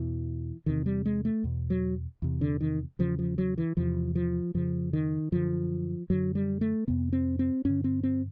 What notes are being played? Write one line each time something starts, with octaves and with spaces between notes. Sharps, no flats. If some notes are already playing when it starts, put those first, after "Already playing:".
Already playing: E2 B2 E3
E2 C3 D#3
G3
G#3
A3
E2 B2
F#3
E2 C3
D3
D#3
E2 C#3 F3
F3
F#3
E3
E2 C3 F3
F3
F2 C#3 F3
D#3
F#2 D3 F3
F#2 D3 F#3
G3
A3
F2 C3 B3
C4
C4
G2 D3 C#4
C4
C4